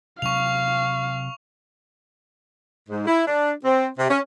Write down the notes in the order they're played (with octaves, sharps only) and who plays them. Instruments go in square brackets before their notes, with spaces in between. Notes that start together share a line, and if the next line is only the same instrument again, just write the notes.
[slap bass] C3 F#3 C4 [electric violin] F5 [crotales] C#6 F7
[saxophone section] G#2
E4
D4
C4
C3
C#4